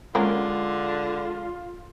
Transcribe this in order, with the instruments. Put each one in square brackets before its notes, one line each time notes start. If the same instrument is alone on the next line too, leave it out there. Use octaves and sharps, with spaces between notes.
[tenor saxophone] D3 [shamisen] F#3 A#3 C#4 [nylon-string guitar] G#3 [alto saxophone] F4